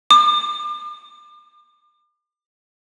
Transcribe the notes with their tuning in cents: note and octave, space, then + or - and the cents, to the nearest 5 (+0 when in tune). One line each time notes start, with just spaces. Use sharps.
D6 +40